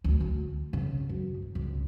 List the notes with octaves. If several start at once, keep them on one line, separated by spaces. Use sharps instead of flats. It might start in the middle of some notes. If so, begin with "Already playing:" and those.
D2
D2
C#3
F#2
G2
C#2